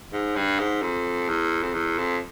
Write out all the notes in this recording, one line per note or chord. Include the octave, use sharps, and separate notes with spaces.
G#2
G2
G#2
F2
E2
F2
E2
F2